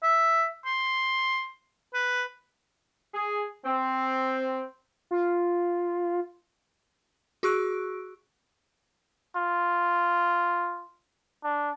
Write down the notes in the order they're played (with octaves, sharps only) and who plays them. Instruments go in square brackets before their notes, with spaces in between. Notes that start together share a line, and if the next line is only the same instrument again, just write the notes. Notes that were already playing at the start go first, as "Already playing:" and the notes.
[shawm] E5
C6
B4
[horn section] G#4
C4
[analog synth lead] F4
[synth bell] F#4 G#4 C#6 E6 F#6 D7
[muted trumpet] F4
D4